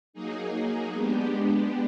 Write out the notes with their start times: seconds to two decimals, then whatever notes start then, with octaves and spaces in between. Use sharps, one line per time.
0.13 F#3 A#3 D#4 G#4
0.92 G#3 B3 D4 G4